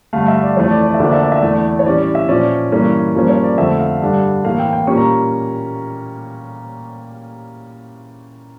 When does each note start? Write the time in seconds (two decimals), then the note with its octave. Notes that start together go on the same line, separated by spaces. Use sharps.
0.13 G2 D3 A3 F5
0.28 E5
0.43 D5
0.57 F2 E3 A3 C#5
0.71 D5
0.86 D5
0.94 E5
0.99 D2 D3 F3 A#3 D4 D5
1.12 E5
1.23 D5
1.32 E5
1.41 E2 E3 A3 D5
1.79 C#5
1.86 A2 E3 G3 C#4 D5
2.00 D5
2.15 E5
2.29 A#2 F3 C#4 D5
2.72 G2 E3 A#3 C#4
3.15 G2 F3 A#3 C#4
3.29 C#5
3.44 D5
3.58 F2 D3 A3 E5
3.79 F5
4.02 G2 D3 G3 D4
4.44 A2 E3 A#3 F5
4.59 G5
4.73 G5
4.87 A#2 G3 A#3 C#4 C#6
4.97 A#5